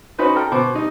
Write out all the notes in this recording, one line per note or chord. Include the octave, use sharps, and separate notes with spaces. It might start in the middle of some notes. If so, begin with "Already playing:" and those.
C#4 D#4 F#4 B4 C5
A4 G5 A#5 F6
B2 C5 D6
G3 D#4